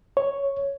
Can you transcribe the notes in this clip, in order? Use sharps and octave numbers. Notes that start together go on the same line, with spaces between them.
C#5